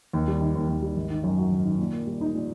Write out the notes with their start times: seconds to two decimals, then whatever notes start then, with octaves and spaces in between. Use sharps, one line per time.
0.13 D#2
0.28 G3
0.41 D#3
0.55 D#2
0.69 D#2
0.82 G3
0.96 G#1
1.10 D#3
1.24 F#2
1.38 F#3
1.51 G#1
1.65 D#3
1.79 A#2
1.92 A#3
2.07 G3
2.21 D#4
2.35 A#2